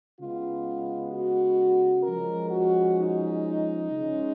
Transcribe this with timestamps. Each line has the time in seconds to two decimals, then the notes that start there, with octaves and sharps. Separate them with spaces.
0.19 C#3 G#3 B3 F4
1.12 F#4
2.04 F3 G#3 C#4 A#4
2.51 F#4
2.97 D#4
3.89 C#3 G#3 C#4